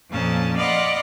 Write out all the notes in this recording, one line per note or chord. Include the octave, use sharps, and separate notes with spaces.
F2 A#2 F3 C#4 A5
D5 D#5 F5 F#5 B5 C6